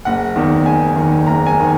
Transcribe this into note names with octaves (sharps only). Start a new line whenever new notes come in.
F#1 F#5
E2 D#3
F#1 G#5
E2 D#3
F#1 A#5
G#5
D#3